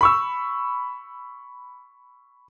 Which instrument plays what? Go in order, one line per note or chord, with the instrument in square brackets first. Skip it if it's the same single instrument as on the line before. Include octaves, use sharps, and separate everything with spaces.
[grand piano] B5 C#6 E6